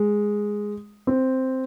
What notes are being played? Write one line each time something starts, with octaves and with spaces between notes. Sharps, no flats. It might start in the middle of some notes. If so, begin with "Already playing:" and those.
Already playing: G#3
C4